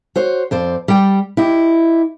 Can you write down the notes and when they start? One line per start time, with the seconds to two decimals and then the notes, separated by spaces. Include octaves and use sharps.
0.16 F#4 C5 C#5
0.51 F2 C5 D5
0.88 G3 G5
1.37 E4 G4 D#5